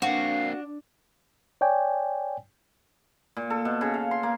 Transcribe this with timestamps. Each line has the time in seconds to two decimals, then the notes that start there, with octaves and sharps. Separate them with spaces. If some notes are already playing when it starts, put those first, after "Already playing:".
0.02 A#3 C4 D4 F#4 F5
1.61 C#5 D5 G5 G#5
3.37 A#2
3.50 A4
3.65 B2
3.81 C#3
3.94 F5
4.11 C6
4.23 A#3